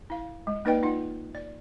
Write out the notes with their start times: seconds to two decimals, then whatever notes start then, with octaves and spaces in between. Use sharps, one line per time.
0.10 E4 F5
0.47 G#3
0.65 A#3 D#4 B4 D5 D#5 G5
0.83 D#4 F4 F#5
1.35 D5